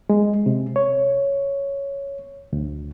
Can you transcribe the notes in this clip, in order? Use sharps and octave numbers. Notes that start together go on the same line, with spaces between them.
G#3
C3
C#5
D2